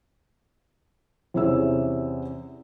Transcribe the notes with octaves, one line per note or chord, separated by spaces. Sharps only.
E2 C3 C#4 G#4 E5 E6